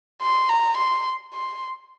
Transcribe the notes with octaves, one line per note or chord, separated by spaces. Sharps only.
C6
A#5
C6
C6